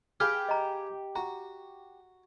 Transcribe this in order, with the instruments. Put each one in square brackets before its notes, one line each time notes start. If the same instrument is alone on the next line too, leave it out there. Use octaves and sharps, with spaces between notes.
[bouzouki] G4 [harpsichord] G#4 B4 F5 [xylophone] F6
[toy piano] D#5 A#5
[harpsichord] F#4 [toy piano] A#5